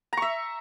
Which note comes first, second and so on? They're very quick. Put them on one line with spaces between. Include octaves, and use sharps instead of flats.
A#5 C#6 E5